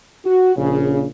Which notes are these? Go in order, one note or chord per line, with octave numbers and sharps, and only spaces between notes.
F#4
A#1 C#3